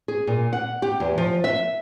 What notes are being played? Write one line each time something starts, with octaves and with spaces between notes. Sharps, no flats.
G#4
A#2
F#5
G4
E2
F3
E5